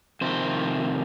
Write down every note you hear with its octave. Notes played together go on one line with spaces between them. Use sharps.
F2 C3 D#3 C5